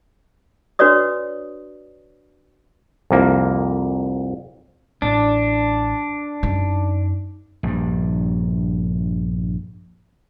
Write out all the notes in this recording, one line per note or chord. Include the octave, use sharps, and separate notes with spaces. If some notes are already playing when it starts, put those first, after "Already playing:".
D4 F#4 B4 C#5 D5 D#6
C2 F2 A#3
A1 D4
F#2 D#4
A#1 G2